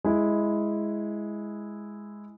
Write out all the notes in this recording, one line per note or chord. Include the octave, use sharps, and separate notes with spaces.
G#3 E4